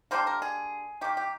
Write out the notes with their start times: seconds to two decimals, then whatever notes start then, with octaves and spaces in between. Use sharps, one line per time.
0.11 D3 G3 A#3 C5
0.27 A#4
0.42 G#4
1.01 D#3 A#3 G4
1.17 G4